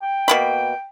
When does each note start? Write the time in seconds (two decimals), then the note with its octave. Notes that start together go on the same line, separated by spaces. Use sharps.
0.02 G5
0.28 B2 A#3 B5